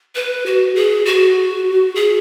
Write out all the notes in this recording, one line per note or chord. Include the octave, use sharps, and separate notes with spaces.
B4
F#4
G#4
F#4
G#4